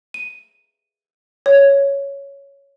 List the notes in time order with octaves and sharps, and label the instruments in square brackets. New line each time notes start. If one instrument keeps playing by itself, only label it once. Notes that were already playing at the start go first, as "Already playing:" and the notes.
[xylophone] D#7
C#5